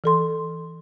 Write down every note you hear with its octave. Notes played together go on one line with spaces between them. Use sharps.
E3 A4 C6